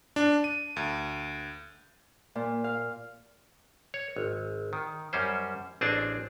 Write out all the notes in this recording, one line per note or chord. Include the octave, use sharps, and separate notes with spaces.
D4
D#7
D2
A#2
F5
C#5
G#1
D#3
F#2 G3 C#4 C5
A1 C4 D4 G#4 A5